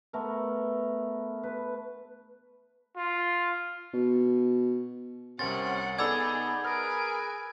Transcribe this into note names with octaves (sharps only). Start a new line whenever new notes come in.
A3 B3 A#4
B4
F4
B2
C2 C3 C#4 A#4 F#5 C6 A6
B3 D#4 G#4 A4 D5 B5 E6 G#6
G#4 A#4 B4 G#5 F6 D7